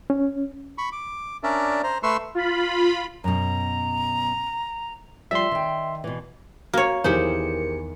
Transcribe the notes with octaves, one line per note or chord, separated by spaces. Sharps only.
C#4
B5 C#6
D6
C#4 D4 A#4 D5 E5
C5 A#5
A3 B4 C6 C#6 E6
F4 B5
F#2 B2 A#5
F3 G3 C5 E5 C6
D#3 G5
B2 E3
A#3 F#4 C#5
E2 D#3 E3 G4 G#4 A#4 C5 C#7